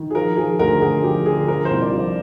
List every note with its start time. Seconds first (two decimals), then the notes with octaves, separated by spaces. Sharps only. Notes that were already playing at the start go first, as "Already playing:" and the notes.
Already playing: D#3
0.10 G#4
0.15 F3 A#4
0.36 F3 G#4
0.59 D2 A#4
0.82 D2 G#4
1.04 F3 G4
1.26 D3 G#4
1.48 F3 A#4
1.65 C5
1.71 C2
1.82 D5
1.93 F3
1.98 D5